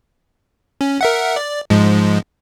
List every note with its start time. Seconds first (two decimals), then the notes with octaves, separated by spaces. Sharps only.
0.81 C#4
1.01 A#4 E5 F#5
1.36 D5
1.70 G#2 F3 G#3